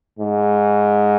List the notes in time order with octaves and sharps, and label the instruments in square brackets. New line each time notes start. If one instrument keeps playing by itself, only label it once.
[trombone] G#2